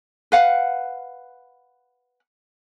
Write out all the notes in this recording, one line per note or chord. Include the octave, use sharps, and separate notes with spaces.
B4 F5 F#5